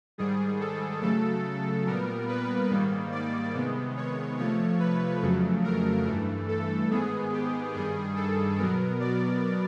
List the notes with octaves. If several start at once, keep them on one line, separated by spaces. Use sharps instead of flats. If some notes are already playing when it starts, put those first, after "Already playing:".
G#2 D#3 G3 G#4
A4
C#3 F#3 A3 A4
A#2 G3 B3 A#4
B4
G#2 D#3 G3 A#3
D5
C3 D#3 G#3 B3
C#5
C3 F3 A3 C#5
B4
F2 C#3 F#3 A3
A#4
G2 E3 A3
A4
G#2 D#3 G#3 B3 G#4
G4
G2 D#3 G3 G#4
A4
B2 F#3 B3 A#4
D5